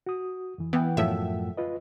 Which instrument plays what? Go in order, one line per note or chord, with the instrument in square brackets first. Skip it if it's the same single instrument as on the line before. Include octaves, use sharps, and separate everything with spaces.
[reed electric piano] F#4 D#6
F2 E3
[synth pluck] E3 B3 [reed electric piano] F#5 G5
[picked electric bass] F#2 A2 F3 [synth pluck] E5
[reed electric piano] F4 B4 D#5